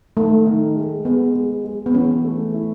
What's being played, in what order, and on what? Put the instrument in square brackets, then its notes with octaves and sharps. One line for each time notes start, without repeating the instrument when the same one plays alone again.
[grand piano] D#3 [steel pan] A3
[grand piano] D#3
G#3
[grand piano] G#3 [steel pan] B3
[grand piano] G#3
G#3
[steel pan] B3
[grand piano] E3 [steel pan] C#4
[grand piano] A3
E4